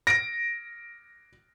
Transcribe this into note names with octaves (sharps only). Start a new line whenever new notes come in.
A#6 D7